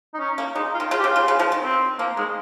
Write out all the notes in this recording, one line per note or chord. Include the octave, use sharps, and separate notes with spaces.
D#4
C#4
A#3
G#3 D#4
F4
D#3
C#3 F4
G4
C#3
F4
C#3
C#3
F3
D#3
C4
F3 A#3
D#3 G#3